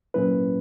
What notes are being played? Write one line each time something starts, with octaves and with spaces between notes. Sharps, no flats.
A#2 F#3 A#3 C#4 E4 B4